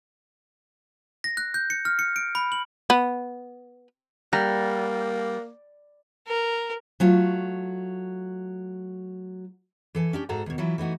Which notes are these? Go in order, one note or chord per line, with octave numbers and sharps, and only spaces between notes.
A#6
F#6
G6
C#7
F6
C#7
D7
B5
F#7
B3
G3 A#3 F#5 A#5
A#4
F#3 A3 F4
E3 A4 G#5
C#4 D4 G4
G#2 F#4 A4 F5 A#5
D#2 B2
E3 F#3 E4 F4
E3 A3 D#4 F#4